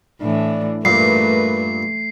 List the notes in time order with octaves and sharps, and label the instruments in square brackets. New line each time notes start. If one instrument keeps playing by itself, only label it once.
[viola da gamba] A2 E3 [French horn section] D4
[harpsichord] G2 A#2 [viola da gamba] A3 [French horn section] A#4 B4 [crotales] C7